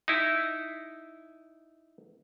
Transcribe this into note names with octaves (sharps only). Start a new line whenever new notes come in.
D#4 E4